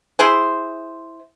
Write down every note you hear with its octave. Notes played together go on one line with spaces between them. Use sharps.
E4 G#4 C5